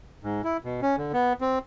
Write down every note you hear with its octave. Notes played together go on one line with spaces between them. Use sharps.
G#2
E4
B2
C#4
D3
B3
C4